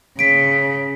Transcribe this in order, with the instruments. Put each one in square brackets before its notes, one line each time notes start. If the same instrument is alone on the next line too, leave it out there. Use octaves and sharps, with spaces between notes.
[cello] C#3 [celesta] B6 D7